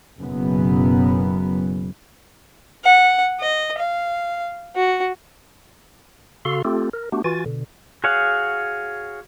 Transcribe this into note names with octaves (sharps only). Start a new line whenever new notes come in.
F#1 F#2 B2 B3
F#5
D#5
F5
F#4
C#3 F#4 A4 F5 C6
A3 C4 F4 G4 A4
A#4
A3 B3 D4 F#4 G4
E3 F4 F#4 G#5 A6
B2 D3
F#4 G#4 C#5 F5 F#5